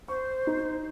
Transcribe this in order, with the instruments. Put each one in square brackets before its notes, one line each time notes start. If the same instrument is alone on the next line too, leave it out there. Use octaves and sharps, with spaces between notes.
[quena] C5 [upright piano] C#6
[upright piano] D#4